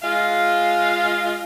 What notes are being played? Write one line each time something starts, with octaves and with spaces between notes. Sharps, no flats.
G#3 F4 F5